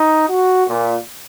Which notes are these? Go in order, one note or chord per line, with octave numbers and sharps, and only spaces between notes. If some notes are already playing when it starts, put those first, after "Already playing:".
Already playing: D#4
F#4
A#2